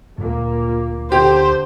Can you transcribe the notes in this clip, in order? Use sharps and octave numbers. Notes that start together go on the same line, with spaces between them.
D2 A#2 A#3
D3 G4 C5